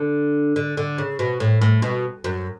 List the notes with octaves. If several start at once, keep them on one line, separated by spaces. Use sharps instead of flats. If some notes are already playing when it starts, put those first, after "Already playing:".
Already playing: D3
D3
D3
C#3
B2
A2
A2
B2
F#2